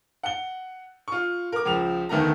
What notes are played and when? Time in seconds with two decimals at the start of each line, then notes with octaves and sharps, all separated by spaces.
0.23 F#5 G7
1.08 F4 C#6
1.52 A#4 D6
1.65 C#2 F3 F7
2.09 D2 D#3 A3 B3 A4 A#5